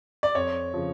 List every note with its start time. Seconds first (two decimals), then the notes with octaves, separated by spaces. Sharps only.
0.23 D5
0.35 F2 C#5
0.74 C#3 F3